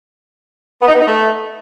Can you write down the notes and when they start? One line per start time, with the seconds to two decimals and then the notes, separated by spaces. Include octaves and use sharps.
0.82 B3
0.88 D#4
0.95 B3
1.01 D#4
1.07 A3